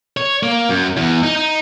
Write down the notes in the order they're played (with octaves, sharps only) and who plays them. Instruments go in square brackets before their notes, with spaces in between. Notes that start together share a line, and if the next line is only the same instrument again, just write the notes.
[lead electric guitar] C#5
A#3
F#2
E2
D#4
D#4